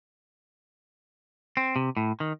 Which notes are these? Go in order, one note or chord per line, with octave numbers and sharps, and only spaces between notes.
C4
C3
A2
D#3